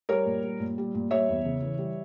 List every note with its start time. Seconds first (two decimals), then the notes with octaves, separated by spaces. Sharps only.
0.09 G3 A#4 C#5
0.26 A#2
0.44 G3
0.60 A#2
0.78 G3
0.95 A#2
1.11 G3 C#5 E5
1.29 E2
1.45 C#3
1.62 E3
1.79 G3